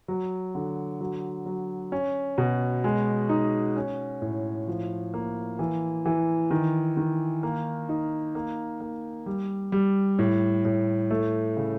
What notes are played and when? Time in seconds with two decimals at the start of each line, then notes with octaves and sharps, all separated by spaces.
0.08 F#3
0.55 D3
1.01 F#3
1.46 F#3
1.92 C#4
2.38 B2
2.84 G#3
3.29 D#4
3.76 C#4
4.22 A2
4.68 F3
5.14 A#3
5.59 E3
6.05 E3
6.51 D#3
6.97 D#3
7.43 A#3
7.89 D#4
8.35 A#3
8.81 A#3
9.26 G3
9.72 G3
10.19 A2
10.65 A2
11.11 A3
11.57 C#3